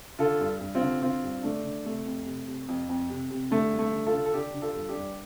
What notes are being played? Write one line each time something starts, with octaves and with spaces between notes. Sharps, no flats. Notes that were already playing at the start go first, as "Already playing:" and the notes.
D3 F4 A4
G2
G2
C4 F4
D3
D3 C4 F4
G2
D3 A3 D4
D3
C3 A3
F2
C3
C3
F2
F2
C3
C3
D3 A3
G2
A3
D3
F4 A4
D3
A4
D3 D4 G4
D3
F4 A4
G2
D4 G4
G2